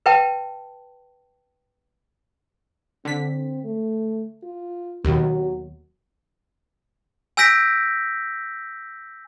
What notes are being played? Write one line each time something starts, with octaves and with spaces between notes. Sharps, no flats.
B4 E5 G5 A5
D3 C4 B6
A3
F4
D#2 B2 F#3
G#5 E6 G6 A#6 B6 D7